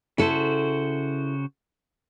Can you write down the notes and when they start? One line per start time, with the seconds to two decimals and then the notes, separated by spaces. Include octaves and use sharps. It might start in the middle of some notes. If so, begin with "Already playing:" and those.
0.18 C#3 E4 F#4 A4 C5